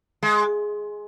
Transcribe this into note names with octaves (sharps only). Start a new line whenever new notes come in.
G#3